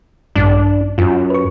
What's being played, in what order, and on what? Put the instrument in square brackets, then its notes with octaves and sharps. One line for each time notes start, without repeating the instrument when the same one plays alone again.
[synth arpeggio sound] A#1 G2 [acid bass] D4
[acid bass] F#2 [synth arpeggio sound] F4
[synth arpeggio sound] B4 C#6